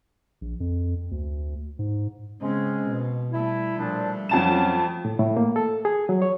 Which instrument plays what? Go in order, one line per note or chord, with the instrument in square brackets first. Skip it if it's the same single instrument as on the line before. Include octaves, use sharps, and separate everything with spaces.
[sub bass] A#1
F2
D2
G#2
[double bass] C#3 C4 [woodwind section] G#3 C#4
[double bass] B2
[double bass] G3 A3 [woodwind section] E4
[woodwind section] A#2 F3 D4
[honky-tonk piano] F2 A5 E7 [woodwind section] F#3 C#4
[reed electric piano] A2
A2
A#3
A4
G#4
F#3
C#5